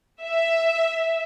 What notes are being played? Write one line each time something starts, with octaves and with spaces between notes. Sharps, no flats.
E5